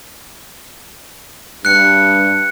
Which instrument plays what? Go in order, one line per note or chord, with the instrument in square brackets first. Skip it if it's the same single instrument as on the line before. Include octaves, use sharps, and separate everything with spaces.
[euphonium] G2 [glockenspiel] F#6 C#7